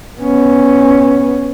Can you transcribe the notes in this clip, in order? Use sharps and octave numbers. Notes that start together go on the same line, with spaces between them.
B3 C#4